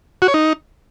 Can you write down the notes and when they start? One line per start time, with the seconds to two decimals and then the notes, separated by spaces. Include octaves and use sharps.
0.22 F#4
0.28 C#5
0.34 D#4